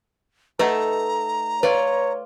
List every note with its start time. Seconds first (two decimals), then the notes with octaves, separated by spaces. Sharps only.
0.59 A3 D#4 A4 B4 D#5 F#5 A#5
1.63 F4 B4 C#5 D5